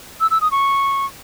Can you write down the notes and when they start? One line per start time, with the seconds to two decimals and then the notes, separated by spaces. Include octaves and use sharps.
0.21 E6
0.31 E6
0.41 D#6
0.51 C#6